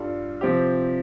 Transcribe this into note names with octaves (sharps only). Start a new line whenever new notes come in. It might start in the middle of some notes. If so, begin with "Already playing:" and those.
Already playing: G2 G3 F4 A4
C3 F3 C4 G4